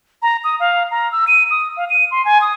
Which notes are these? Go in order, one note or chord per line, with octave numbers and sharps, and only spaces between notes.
A#5
D#6
F5
A#5
E6
D#7
D#6
F5
D#7
C6
G#5
D#6